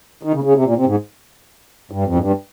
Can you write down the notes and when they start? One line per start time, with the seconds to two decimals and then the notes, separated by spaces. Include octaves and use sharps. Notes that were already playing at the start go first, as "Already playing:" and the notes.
0.23 D#3
0.34 C#3
0.44 C#3
0.54 C3
0.65 A#2
0.76 C3
0.86 G#2
1.91 G2
2.06 F2
2.15 G#2
2.19 G2